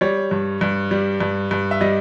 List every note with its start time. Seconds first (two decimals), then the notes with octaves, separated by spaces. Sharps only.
0.01 G3 C#5
0.31 G2
0.61 G2
0.91 G3
1.20 G2
1.51 G2
1.71 E5
1.81 G3 D#5